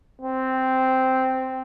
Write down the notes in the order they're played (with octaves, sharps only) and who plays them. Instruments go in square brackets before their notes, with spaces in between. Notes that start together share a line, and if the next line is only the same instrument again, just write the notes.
[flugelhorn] C4